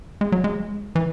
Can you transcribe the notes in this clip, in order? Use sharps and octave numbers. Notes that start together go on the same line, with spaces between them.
G#3
F#3
G#3
E3